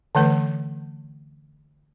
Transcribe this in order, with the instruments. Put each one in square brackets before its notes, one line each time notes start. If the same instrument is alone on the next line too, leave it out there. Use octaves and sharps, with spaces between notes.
[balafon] D3 E3 A3 B4